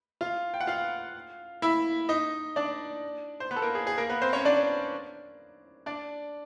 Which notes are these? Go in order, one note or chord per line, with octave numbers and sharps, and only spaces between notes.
F4 F5
G5
F#5
F4 F5
E4 E5
D#4 D#5
D4 D5
C5
B3 B4
A4
A#3 A#4
G#4
G#4
A#3 A#4
B3 B4
C4 C5
C#4 C#5
D4 D5
D4 D5